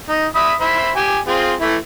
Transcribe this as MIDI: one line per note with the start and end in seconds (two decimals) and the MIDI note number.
0.09 0.26 63
0.35 0.53 76
0.35 0.53 83
0.35 0.53 87
0.61 0.91 72
0.61 0.91 76
0.61 0.91 83
0.96 1.19 67
0.96 1.19 80
1.27 1.53 60
1.27 1.53 65
1.27 1.53 68
1.61 1.76 52
1.61 1.76 57
1.61 1.76 64